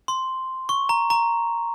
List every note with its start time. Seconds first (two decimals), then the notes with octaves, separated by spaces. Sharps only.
0.08 C6
0.69 C#6
0.89 A#5
1.10 A#5